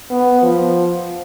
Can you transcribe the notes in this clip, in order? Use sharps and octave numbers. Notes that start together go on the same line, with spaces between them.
B3
F3